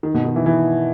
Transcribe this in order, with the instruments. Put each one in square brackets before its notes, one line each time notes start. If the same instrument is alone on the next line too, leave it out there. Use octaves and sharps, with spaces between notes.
[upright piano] D#3
B2
D#3
E3
E3